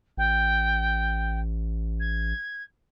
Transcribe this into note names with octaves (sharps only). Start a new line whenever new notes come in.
A1 G5
G#6